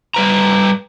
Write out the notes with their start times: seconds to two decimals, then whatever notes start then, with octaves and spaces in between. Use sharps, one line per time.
0.14 G3 B4 A#5